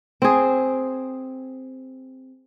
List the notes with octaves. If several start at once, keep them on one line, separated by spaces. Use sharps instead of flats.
C4 G#4